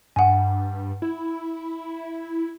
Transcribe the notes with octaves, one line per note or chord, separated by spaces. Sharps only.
G2 F#5 G#5
E4